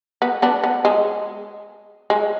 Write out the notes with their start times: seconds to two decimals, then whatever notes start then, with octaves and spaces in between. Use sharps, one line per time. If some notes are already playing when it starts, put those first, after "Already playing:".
0.22 B3
0.42 B3 D4
0.64 B3
0.85 G#3
2.10 G#3